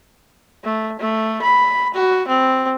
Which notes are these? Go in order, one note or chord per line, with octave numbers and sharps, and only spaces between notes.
A3
A3
B5
F#4
C4